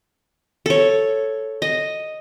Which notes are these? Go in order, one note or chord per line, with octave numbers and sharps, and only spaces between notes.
A4 C#5
D#5